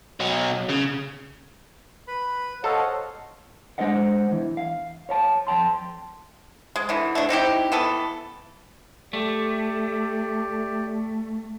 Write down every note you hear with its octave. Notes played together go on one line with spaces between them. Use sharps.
B2 F#3
C#3
B4 B5
A4 C5 C#5 D#5 F5 F#5
G#3 D4 C5 D#5 F#5
E2 E3
F5
C#5 F5 A5
F2 G5 A5 C6
G#3
D3 E3
A3 D4
C4 D#4 E4 G4
E3 B3 A4
A3 G4 D5